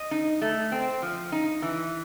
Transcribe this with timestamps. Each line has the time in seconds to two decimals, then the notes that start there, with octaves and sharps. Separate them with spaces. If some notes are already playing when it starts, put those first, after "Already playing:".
Already playing: D#5
0.11 D#4
0.42 A3
0.72 C4
1.02 F3
1.32 D#4
1.62 E3